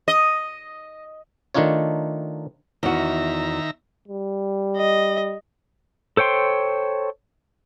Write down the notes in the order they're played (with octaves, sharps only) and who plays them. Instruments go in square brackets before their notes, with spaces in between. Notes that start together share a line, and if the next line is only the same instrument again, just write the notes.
[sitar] D#5
[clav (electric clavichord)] D#3 A3 D4 D#4 F4 C#5
[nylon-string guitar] E2 F#4 [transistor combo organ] D#3 E5 A#5
[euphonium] G3
[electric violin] D#5
[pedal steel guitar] A4 C5 C#5 G5 C6